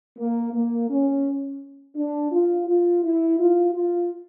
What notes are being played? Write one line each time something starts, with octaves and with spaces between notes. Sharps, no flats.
A#3
A#3
C#4
D4
F4
F4
E4
F4
F4